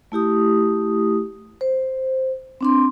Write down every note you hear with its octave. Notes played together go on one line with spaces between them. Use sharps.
A3 E4 G4 D#6
C5
C4 D4 C6